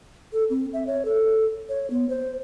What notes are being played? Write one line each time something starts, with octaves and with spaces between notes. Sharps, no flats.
A4
C4
E5
C#5
A4
C#5
B3
C5